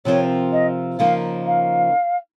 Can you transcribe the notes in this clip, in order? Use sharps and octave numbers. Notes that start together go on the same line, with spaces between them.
C3 F3 C4 F4 A#4 C#5
D#5
C#3 F3 A#3 D#4 A#4 F5
F5